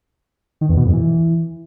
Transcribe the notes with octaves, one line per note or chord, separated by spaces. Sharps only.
D#3
E2
B2
F2
E3